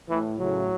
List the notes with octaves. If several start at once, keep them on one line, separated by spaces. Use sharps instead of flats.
A2 E3
A2 C#3 F#3